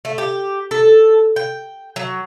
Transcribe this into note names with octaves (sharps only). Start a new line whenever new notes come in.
A3
G4
A4
G5
F#3